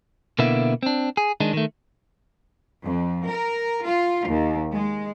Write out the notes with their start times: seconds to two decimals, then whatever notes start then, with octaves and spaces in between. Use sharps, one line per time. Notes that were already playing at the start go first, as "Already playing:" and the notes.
0.39 B2 D3 A#3 B3 E4 E5
0.83 C4 D4
1.17 G#4
1.40 D#3 G#3 D4
1.53 D#3 A3
2.83 F2
3.26 A#4
3.84 F4
4.26 D#2
4.75 G#3